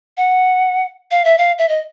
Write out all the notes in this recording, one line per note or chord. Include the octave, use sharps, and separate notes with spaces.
F#5
F5
E5
F5
E5
D#5